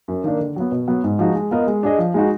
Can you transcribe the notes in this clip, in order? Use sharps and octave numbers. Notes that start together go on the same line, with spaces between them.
F#2
D#3 A#3 D4
D3
F#3 B3
B2
F#3 B3
G#2
F3 G#3 D#4 F#4
G#3
B3 F4 A#4 D#5
G#3
D4 G#4 D#5
F3
G#3 D#4 F#4